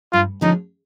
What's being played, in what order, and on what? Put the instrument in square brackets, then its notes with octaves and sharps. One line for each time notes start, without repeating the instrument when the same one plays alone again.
[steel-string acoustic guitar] G2 [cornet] F4
[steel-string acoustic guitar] D3 F3 G#3 C#4 [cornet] D#4